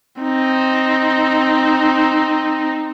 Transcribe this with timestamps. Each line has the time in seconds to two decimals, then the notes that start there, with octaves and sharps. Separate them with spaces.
0.22 C4 D#4